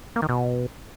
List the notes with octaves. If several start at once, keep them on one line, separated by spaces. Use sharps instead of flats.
A#3
D#3
B2